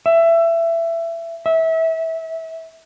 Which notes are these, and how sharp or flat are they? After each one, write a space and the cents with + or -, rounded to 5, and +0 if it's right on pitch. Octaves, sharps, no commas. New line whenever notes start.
E5 +20
E5 -25